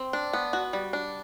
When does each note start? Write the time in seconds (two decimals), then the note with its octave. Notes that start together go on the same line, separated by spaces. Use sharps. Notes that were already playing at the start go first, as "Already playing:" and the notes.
Already playing: C4
0.13 D4
0.33 B3
0.53 F#4
0.73 G3
0.93 D4